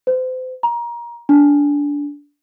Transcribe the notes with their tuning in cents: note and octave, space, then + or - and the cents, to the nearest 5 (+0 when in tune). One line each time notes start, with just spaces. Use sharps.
C5 -35
A#5 +25
D4 -20